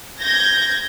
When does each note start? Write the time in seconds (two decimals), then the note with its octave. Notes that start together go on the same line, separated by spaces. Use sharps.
0.20 G6 G#6 A#6